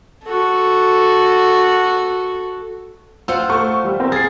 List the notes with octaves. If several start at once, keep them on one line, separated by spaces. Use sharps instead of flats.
F#4 A4
F4 C5 F#5 E6
A3 C#6
G3
C4 A#4
G#4 A6 C7